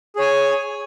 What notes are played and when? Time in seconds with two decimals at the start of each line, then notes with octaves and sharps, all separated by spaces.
0.16 G#4
0.19 C#5
0.21 G#5